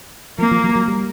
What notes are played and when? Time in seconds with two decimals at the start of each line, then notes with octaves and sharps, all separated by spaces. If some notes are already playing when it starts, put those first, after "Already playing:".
0.38 F3 A#3
0.51 F3
0.64 F#3
0.75 F#3
0.88 G3